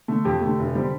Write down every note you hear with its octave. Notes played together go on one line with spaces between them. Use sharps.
D3 A3
F2 G4
D3 A3
F1
D3 G3 C4